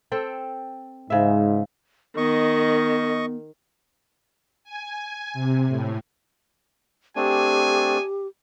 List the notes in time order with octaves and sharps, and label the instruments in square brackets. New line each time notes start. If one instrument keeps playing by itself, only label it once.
[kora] C4 A4 G5
[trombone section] G#2 [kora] C#3 E5
[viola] D#3 [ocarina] B3 [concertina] D#5 C#6
[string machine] G#5
C3
A2
[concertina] A3 C4 D4 [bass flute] G4 [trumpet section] G#4 G#5